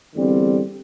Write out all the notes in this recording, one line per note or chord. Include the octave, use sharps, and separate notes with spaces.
E2 D3 G3 C4